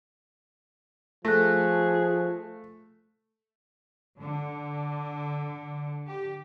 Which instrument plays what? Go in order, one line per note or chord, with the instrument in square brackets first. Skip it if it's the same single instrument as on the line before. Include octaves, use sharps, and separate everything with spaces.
[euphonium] F3 [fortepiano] A3 [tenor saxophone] G#4 [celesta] F#6 A#6
[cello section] D3
G4